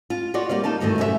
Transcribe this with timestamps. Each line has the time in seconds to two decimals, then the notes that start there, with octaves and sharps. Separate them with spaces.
0.10 F4
0.34 F4 F#4 C#5 D5
0.49 G3 A#3 D5 F5
0.64 A#3 D#4 F5 A5
0.80 D2 G2 D#3 E3 A3
0.98 F#2 B2 A3 C5 E5